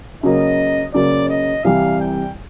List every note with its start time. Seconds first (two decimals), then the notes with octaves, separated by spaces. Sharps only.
0.23 C#3 F#3 A#3 D#5
0.94 C#3 F#3 A#3 D5
1.30 D#5
1.64 C2 C3 E3 G3 F5
2.00 G5